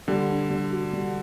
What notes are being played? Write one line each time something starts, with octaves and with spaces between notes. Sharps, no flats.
D3 G3
D4
G3
F#4
G3